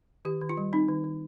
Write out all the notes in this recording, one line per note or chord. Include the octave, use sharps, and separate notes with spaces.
D#3 G4
D#3
F4
G3
C4 D#4
D#3
D#3